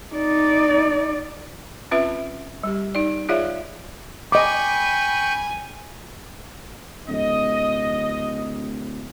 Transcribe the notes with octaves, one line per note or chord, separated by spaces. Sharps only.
D#4 D5
C4 C#4 F4 B4 E5
G3 G4
D#4 D5
F4 G#4 C#5 D5 E5 F5
D#5 G5 G#5 B5 C#6 D6
D1 D#5